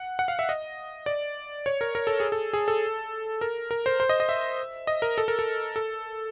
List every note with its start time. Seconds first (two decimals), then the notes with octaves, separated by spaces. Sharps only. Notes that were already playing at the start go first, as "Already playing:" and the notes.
Already playing: F#5
0.19 F#5
0.28 F5
0.39 E5
0.49 D#5
1.06 D5
1.66 C#5
1.81 A#4
1.95 A#4
2.07 A4
2.20 G#4
2.32 A4
2.53 G#4
2.68 A4
3.41 A#4
3.71 A#4
3.86 C5
4.00 C5
4.09 D#5
4.20 D#5
4.29 E5
4.87 D#5
5.02 A#4
5.18 A4
5.28 A#4
5.39 A4
5.76 A4